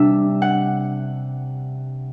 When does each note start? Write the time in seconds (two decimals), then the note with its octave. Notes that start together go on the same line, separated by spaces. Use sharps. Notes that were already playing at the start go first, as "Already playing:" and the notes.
Already playing: C3 G3 D4 E5
0.42 F#5